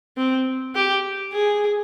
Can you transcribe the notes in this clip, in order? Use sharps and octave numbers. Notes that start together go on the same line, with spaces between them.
C4
G4
G#4